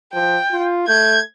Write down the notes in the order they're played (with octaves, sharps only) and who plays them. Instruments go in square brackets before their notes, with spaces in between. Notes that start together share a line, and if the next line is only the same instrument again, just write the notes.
[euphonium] F3 [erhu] G5
[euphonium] F4
[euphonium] A3 [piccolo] G6 [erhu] G#6